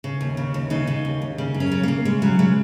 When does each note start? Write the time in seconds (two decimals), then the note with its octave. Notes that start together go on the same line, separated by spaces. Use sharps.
0.04 C#3
0.21 D#2
0.37 C#3
0.54 D#2
0.70 C#3 D#4
0.87 C#3
1.05 D#2
1.22 D#2
1.38 C#3
1.54 F#2
1.60 C#4
1.72 C#3
1.83 C#3 A#3
2.05 C#3 G#3
2.22 C#3 F#3
2.39 C#3 G#3